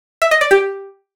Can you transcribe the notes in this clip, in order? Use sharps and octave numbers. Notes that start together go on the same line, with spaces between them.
E5
D#5
D5
G4